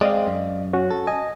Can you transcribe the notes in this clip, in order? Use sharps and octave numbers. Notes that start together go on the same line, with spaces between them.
G#3 C4 D5 D#5 F5
F#2
C#4 F#4
A4
D#5 G#5